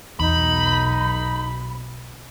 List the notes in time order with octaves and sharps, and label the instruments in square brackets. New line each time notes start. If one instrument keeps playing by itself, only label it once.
[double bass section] B1 [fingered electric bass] E2 [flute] D#4 [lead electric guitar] B5